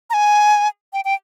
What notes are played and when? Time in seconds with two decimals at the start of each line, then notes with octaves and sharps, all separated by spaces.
0.10 A#5
0.13 G#5
0.93 G5
1.05 G5